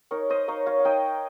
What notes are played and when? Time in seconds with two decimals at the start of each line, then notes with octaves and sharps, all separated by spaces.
0.11 D#4 A#4 C#5
0.30 C5 D#5
0.48 D#4 C#5 F5
0.66 C#5 F5
0.79 F5
0.85 D#4 D#5 G5